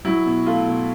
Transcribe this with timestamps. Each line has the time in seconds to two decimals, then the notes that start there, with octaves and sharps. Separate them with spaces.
0.05 F#3 E4
0.26 B2
0.46 A3 F4
0.67 B2